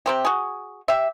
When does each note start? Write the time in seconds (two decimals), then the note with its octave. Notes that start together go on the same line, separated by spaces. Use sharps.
0.06 C3 C4 G4
0.25 F#4 G#4
0.88 G4 E5